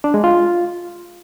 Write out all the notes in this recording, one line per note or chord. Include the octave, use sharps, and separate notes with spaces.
D4
G#3
F4